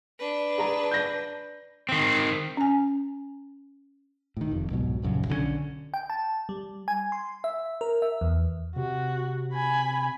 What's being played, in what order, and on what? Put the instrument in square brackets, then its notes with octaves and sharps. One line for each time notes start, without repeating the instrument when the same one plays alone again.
[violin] D4 B4
[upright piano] G#4 A5 A#5
G6 A#6
[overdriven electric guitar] D#3 C4
[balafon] C#4 G#5
[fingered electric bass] A2 D#3
F1 F2
C2 G#2 B2 F#3
D#1 A#1 F#2 C#3
B1 D3 F#3 C#4
[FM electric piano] G5
A5
G3
G#5
C6
E5
A#4
E5
E2
[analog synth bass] C3 [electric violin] F#4
[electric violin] G#5 B5